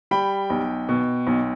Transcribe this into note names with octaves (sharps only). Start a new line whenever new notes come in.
G3 G5 B5
B1
B2
B1